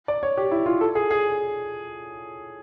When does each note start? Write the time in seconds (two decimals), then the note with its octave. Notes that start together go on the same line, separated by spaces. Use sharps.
0.08 D5
0.23 C#5
0.37 G4
0.51 E4
0.66 F4
0.81 A4
0.95 G#4
1.11 G#4